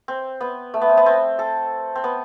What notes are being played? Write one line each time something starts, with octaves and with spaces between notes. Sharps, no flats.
C4
B3
A3
B3
C4
B3
C4
A4
C4
B3